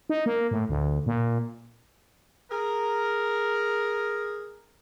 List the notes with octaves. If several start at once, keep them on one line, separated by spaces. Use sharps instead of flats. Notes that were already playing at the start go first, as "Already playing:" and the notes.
D#4
A#3
A2
D2
A#2
G#4 A#4